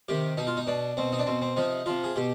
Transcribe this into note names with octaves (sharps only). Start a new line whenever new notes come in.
C3 D#3 G4
B2 D#4
F4
D#4
B2 D4
B2 C4
D#4
D4
B2 C4
C4
C3 F3 D#4
C3 F3 F4
G#4
B2 G4